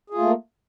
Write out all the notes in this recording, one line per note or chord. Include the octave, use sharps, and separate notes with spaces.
A3 A#3 F4 G#4